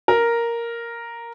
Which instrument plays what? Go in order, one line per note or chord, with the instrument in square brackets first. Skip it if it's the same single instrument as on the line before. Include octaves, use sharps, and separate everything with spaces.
[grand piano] A#4